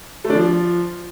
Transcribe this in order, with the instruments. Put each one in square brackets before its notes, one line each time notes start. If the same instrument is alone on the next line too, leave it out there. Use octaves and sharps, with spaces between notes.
[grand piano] A3
D4
F3